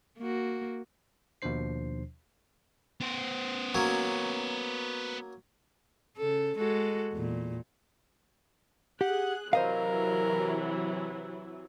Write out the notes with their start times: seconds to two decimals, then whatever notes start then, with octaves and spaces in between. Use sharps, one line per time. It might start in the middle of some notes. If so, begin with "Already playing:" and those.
0.18 A#3 F#4
1.42 D#2 B2 F3 D4 C5 C7
3.00 B3 C5
3.74 F#3 A#3 C#4
6.17 C#3 A4
6.57 G#3 F#4 A4
7.12 E2 A#2
9.01 G4 G#4 F#5 F#6
9.53 C3 E3 F#3 A#4 C5 D#5 F5